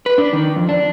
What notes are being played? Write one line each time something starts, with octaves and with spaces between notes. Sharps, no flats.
B4
D4
D#3
F2
D4